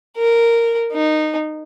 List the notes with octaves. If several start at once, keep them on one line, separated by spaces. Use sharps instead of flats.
A#4
D#4